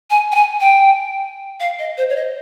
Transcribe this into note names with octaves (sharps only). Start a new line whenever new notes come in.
G#5
G5
G#5
G5
F5
D#5
C5
C#5
D#5